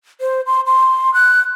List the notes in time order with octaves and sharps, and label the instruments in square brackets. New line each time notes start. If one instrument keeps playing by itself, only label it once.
[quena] C5
C6
C6
F#6